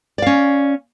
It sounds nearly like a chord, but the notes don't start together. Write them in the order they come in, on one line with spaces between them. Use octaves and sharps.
D5 F5 C#4